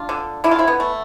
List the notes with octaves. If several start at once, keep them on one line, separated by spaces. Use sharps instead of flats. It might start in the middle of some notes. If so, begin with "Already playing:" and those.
Already playing: D4 F4
D3
D3 E4
F4
C4 E4
B3
A3